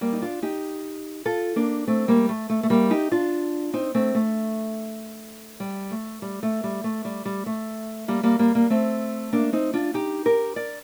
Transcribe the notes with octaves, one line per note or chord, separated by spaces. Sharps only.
G3 A#3
D#4
D4 F4
D#4 G4
F4 A4
A#3 D4
A3 C4
G3 A#3
A3
A3
A3
G3 A#3
D#4 G4
D4 F4
C4 D#4
A3 C4
A3
G3
A3
G3
A3
G3
A3
G3
G3
A3
G3 A#3
G3 A#3
G3 A#3
G3 A#3
A3 C4
A#3 D4
C4 D#4
D4 F4
D#4 G4
G4 A#4
A#4 D5